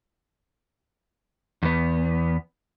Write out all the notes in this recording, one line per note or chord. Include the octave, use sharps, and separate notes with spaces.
E2 B3